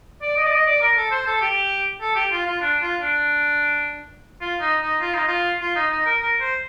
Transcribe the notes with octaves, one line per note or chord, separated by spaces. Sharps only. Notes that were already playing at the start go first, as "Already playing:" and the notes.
D5
D#5
D5
D#5
D5
A#4
A4
C5
A4
G4
A4
G4
F4
F4
D4
F4
D4
F4
D#4
D#4
F4
D#4
F4
F4
D#4
D#4
A#4
A#4
C5